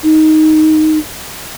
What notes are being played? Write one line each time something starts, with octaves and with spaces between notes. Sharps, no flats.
D#4